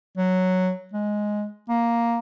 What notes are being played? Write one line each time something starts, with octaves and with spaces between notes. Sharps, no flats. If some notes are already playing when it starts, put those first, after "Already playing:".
F#3
G#3
A#3